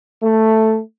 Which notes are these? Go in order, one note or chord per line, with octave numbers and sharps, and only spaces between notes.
A3